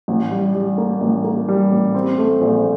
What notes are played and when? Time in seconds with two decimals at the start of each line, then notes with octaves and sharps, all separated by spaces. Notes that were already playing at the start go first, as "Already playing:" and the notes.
0.08 A1
0.31 G3
0.55 G3
0.78 A#3
1.01 A1
1.24 A#3
1.48 G3
1.71 A1
1.95 C4
2.18 A3
2.41 A#1